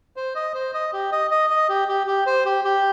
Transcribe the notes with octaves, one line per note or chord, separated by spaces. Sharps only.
C5
D#5
C5
D#5
G4
D#5
D#5
D#5
G4
G4
G4
C5
G4
G4